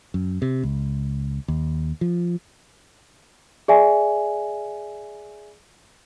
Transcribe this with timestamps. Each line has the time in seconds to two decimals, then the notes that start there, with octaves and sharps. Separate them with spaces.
0.14 F#2
0.42 C3
0.63 C#2
1.48 D#2
2.01 F3
3.68 G#4 D5 E5 G#5